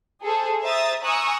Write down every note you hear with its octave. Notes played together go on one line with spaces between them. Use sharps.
G#4 A4 C5
C5 E5 A#5 D#6 A6
G#5 A#5 C#6 D#6 E6 F#6